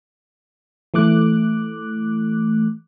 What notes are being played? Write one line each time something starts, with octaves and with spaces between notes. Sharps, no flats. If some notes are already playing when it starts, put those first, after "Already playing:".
E3 A3 D6 F#6